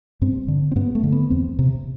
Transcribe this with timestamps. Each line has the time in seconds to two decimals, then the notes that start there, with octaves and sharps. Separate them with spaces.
0.22 G2 C4
0.48 D3
0.72 C4
0.76 G2 B3
0.95 A3
1.03 D3
1.12 B3
1.30 E2 C4
1.59 C3